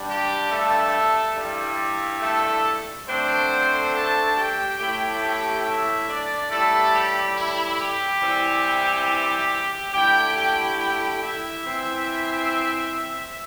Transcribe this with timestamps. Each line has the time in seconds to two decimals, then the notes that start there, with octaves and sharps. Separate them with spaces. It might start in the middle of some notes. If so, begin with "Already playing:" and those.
Already playing: G2 G3 D4
0.08 G4
0.50 A3 A4
1.36 G2 G3 E4
2.21 A3 A4
3.07 D3 A3 C4 D4 C5
3.93 A4 A5
4.36 G4 G5
4.78 A2 A3 E4 G4 G5
5.21 G4 G5
5.65 E4 E5
6.07 D4 D5
6.50 A2 G3 A3 E4 A4
6.93 G4
7.36 E4
7.78 G4
8.21 E3 G3 C4 E4
9.92 D3 A3 E4 G4 G5
10.35 G4 G5
10.78 G4 G5
11.21 E4 E5
11.65 E3 C4 E4